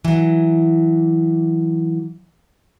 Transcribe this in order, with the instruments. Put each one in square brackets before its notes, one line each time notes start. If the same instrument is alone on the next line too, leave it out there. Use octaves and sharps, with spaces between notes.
[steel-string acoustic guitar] E3 F#3